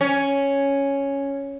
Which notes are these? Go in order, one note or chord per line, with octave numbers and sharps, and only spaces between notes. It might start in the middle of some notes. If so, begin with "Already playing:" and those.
C#4